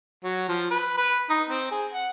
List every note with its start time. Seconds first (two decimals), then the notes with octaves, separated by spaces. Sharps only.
0.24 F#3
0.49 F3
0.71 B4
0.97 B4
1.30 D#4
1.49 C4
1.71 G#4
1.93 F#5